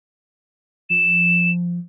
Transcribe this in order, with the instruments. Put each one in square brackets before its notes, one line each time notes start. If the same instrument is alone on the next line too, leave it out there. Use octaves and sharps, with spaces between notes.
[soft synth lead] F3 [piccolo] E7